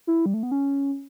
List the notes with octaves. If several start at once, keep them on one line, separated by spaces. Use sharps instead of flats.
E4
G3
A3
B3
C#4